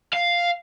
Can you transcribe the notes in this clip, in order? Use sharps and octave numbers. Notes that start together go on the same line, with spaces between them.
F5